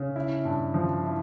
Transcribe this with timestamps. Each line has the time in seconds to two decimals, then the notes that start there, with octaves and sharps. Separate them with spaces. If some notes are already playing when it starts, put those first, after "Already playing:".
Already playing: C#3
0.16 E4
0.45 G2
0.74 F3
1.04 E4